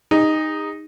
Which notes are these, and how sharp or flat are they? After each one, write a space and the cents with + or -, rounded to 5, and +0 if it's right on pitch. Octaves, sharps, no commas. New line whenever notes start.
D#4 +0 G#4 -40